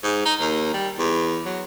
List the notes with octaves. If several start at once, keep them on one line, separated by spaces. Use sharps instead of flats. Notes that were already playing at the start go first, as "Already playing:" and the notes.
G#2
D#4
D#2
G3
E2
F#3